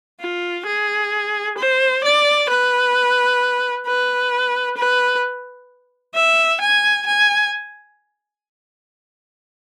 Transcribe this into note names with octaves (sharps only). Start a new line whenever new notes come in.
F4
G#4
C5
D5
B4
B4
B4
E5
G#5
G#5